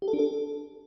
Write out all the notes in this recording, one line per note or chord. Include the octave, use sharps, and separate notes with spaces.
G4
A4
D4
A4